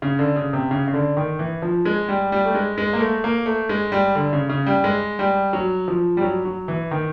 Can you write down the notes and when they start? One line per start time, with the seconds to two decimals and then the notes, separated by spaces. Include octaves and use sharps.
0.02 C#3
0.19 D3
0.36 C#3
0.53 C3
0.71 C#3
0.87 C#3
0.94 D3
1.17 D#3
1.39 E3
1.62 F3
1.85 G#3
2.09 G3
2.32 G3
2.45 A3
2.54 G#3
2.78 G#3
2.93 A#3
3.00 A3
3.24 A#3
3.46 A3
3.69 G#3
3.92 G3
4.15 D3
4.33 C#3
4.49 C#3
4.66 G3
4.84 G#3
5.19 G3
5.53 F#3
5.88 F3
6.17 G3
6.22 F#3
6.45 F#3
6.68 E3
6.91 D#3